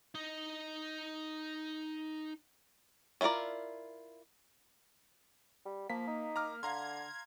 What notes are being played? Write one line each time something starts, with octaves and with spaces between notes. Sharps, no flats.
D#4 D#5
C#4 E4 F4 A#4 D5
G3
F3 A#3 B6
D#4
A#5 D6 F6
D3 F5 A#5 C6 G#6